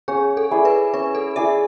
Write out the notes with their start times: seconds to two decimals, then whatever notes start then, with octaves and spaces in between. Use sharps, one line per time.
0.08 C#4 G#4
0.37 A4
0.51 E4 G#4 D5
0.65 B4
0.94 C#4 B4
1.15 A4
1.36 E4 G#4 D5 E5